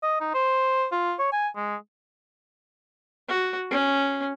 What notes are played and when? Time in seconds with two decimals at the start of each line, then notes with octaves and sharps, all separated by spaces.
0.03 D#5
0.21 D#4
0.34 C5
0.92 F4
1.19 C#5
1.33 G#5
1.56 G#3
3.28 F#4
3.71 C#4